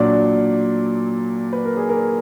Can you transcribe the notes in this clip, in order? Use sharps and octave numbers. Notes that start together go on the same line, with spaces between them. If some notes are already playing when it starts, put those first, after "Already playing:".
Already playing: A#2 F#3 D4 D5
B4
A#4
G#4
A#4